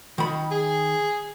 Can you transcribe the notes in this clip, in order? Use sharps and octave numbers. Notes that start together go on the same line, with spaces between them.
D#3 B5
G#4